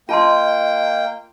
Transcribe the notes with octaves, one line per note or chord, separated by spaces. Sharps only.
A#3 F4 D#5 G5 A5 C6